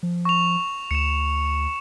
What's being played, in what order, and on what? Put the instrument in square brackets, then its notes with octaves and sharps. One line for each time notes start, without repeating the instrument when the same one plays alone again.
[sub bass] F3
[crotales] C#6 F7
[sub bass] D2 [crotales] C#7 E7